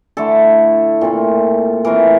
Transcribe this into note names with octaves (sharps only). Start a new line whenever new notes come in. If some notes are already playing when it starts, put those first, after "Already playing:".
D3 A3 E4 A4
A#2 A3 C4 F4
E3 A3 C4 F4 A#4